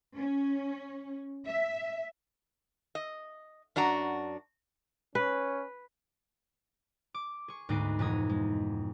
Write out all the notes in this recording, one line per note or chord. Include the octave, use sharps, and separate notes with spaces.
C#4
E5
D#5
F#2 D4 F#4 A#5
C#4 B4
D6
G#4 C#6
D2 G#2 B3 D#4 D6 C7
E1 F2 D#4 D#6 G#6
G#3